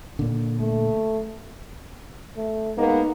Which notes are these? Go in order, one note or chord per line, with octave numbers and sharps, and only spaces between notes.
A#2 D3
A3
A3
G#3 A#3 B3 D#4